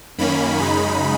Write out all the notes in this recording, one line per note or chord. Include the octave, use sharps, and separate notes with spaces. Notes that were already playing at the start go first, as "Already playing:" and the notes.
F#2 D#3 A#3 C#4 B5
F#2 C#3 G#3 D#4 B5